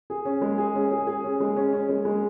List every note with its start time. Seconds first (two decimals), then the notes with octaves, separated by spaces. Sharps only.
0.10 G#4
0.25 C#4
0.42 G#3
0.58 G#4
0.75 C#4
0.92 G#4
1.07 G#4
1.24 C#4
1.40 G#3
1.57 C#4
1.73 C#4
1.89 G#3
2.05 G#3